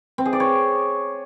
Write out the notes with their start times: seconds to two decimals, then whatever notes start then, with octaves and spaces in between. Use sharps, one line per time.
0.18 C4
0.25 G#4
0.33 D5
0.40 C#5